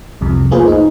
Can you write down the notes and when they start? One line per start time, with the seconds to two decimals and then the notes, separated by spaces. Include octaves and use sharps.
0.21 C2 F2 C3
0.51 A3 A#3 F4 G#4 B4 C5
0.68 D#4